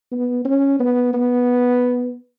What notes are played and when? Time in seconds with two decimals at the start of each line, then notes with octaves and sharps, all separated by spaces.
0.12 B3
0.45 C#4
0.80 B3
1.13 B3